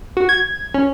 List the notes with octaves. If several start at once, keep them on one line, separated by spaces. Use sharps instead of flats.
F#4
G#6
C#4